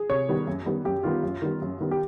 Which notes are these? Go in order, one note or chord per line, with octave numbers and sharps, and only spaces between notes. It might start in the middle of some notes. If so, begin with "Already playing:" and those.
Already playing: G#4
C3 C#5
D#3 G3 B3
F#2
D#3 G3 B3
F#2 G4
D#3 G3 B3 F4
F#2
D#3 G3 B3
F#2
D#3 G3 B3
G4